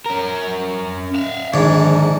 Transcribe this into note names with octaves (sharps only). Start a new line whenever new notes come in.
C#4 A#4
E5 F5
A#1 G#2 D3 D#3